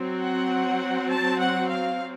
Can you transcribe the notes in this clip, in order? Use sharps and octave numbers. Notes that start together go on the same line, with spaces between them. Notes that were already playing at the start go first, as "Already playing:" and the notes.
Already playing: F#3 C4
F#5
A5
F#5
F5